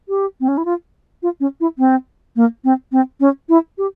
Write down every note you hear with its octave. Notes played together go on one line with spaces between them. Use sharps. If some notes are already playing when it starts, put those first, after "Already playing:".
G4
C4
C#4
E4
F4
F4
C#4
E4
C4
A#3
C4
C4
C#4
E4
G4